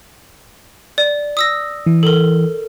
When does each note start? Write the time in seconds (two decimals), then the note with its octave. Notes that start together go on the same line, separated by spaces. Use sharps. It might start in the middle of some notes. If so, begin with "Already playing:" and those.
0.98 D5
1.37 D#6 E6 A#6
1.86 E3
2.03 A4 A#4